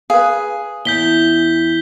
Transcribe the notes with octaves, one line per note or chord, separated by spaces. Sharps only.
G#4 B4 F5
E2 G6 B6 G7